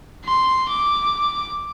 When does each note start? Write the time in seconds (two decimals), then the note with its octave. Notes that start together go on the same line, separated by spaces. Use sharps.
0.25 C6
0.69 D6